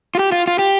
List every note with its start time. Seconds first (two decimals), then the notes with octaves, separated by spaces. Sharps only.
0.15 F4
0.19 G4
0.32 F4
0.47 F4
0.59 G4